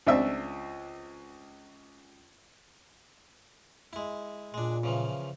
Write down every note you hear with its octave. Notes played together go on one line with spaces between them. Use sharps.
C#2 C4 D4 E5 E6
G#3 E4
A#2 G#3 D4
C#3 E3 F3